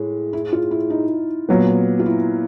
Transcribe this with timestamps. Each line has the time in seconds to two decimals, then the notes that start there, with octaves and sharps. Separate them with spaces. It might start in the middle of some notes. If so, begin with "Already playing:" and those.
Already playing: A2 G#3
0.33 E4
0.53 F4
0.71 E4
0.90 D#4
1.49 A#2 F#3 B3
1.99 F4
2.06 E4